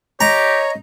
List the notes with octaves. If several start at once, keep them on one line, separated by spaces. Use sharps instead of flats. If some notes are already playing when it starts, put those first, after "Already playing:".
G4 C#5 D#5 A#5